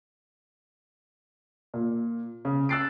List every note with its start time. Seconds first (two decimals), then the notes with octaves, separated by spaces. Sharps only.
1.74 A#2
2.45 C#3
2.69 E6 F#6 A6 C7 D7